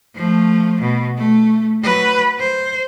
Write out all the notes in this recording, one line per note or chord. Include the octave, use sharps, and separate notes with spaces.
F3 A3
B2
A3
F#3 B4
C5